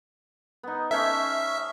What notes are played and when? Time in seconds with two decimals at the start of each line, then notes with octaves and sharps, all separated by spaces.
0.63 B3 D#4
0.91 A3 C#4 C5 E5